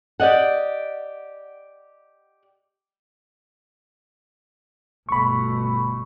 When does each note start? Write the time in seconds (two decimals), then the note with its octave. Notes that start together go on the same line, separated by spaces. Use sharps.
0.20 G4 D5 D#5 F#5
5.09 G1 B2 A3 B5 C#6